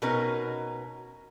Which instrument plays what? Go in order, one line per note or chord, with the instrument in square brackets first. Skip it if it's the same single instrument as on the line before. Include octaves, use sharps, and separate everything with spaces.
[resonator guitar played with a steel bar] B2 C#4 D#4 A#4 B4